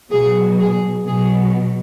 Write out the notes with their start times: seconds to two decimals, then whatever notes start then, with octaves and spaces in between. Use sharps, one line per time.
0.10 B2 F#3 G#4
0.59 G#4
1.07 B2 F#3 G#4